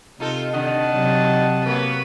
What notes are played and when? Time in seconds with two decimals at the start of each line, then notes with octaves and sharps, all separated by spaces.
0.20 C3 D#4 F4 A4
0.54 D3 D#3 D#5 F#5 A5
0.92 C3 F#3
1.66 F#3 A#3 B3 B4